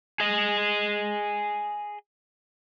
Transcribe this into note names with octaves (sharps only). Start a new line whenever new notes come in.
G#4 D#5